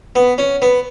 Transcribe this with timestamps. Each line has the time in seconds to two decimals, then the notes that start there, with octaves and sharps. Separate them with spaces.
0.16 B3
0.38 C#4
0.62 B3